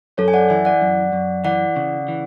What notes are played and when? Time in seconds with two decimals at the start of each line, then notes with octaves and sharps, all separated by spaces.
0.18 F#2 A4 C#5
0.28 G#5
0.33 D5 F#5
0.50 E3 E5 G#5
0.65 D5 F#5
0.81 F#2
1.13 F#2
1.44 E3 D5 F#5
1.76 C#3
2.08 E3